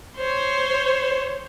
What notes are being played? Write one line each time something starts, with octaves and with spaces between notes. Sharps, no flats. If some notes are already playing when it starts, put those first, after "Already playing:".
C5 C#5